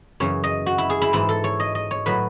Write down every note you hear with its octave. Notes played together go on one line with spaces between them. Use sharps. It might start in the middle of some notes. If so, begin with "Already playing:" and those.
F#2 C#3 E3 C#5
D#5
F#4
E4
G#4
E4
G#2 E3 E4
A4
C#5
D#5
D#5
C#5
A2 F#3 B4